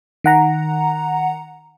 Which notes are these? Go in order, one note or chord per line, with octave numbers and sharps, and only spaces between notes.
D#3 F#5 A#5